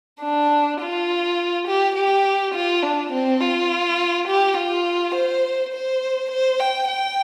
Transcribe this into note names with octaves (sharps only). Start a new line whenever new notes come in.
D4
F4
G4
G4
F4
D4
C4
F4
G4
F4
C5
C5
C5
G5
G5